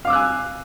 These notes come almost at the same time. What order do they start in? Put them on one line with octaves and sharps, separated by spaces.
F5 D6 E6 F#6 G#5